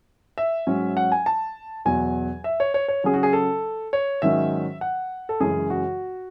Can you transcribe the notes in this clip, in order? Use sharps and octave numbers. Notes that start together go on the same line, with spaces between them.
E5
G#2 F#3 C#4
F#5
G#5
A5
E2 B2 F#3 G#5
E5
C#5
C#5
C#5
C#3 F#3 C#4 G#4
F#4
G#4
A4
C#5
G#2 D#3 F#3 C#4 E5
F#5
A4
F#2 C#3 E3 G#3 C#4 G#4
F#4